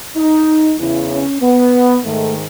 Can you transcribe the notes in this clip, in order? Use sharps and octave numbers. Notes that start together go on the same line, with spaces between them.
D#4
E2 C#3 E3 E4
C#4
B3
G#2 D#3 A3